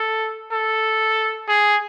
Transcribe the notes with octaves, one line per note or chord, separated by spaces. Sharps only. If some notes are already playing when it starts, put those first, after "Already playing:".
Already playing: A4
A4
G#4